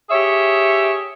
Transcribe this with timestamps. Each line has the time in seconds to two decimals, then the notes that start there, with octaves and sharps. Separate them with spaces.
0.10 G4 G#4 C#5 E5